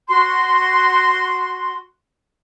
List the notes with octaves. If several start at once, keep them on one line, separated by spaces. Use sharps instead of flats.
F#4 C6